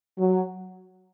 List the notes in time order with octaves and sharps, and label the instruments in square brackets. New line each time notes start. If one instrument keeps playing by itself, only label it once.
[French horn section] F#3